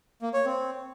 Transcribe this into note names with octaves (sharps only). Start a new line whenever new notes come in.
A#3
C#5
C4